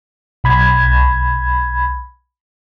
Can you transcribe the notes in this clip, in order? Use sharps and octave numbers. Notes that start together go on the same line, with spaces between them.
B1 B5 G#6